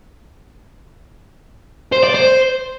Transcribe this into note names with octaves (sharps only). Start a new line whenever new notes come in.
C5
D5
C5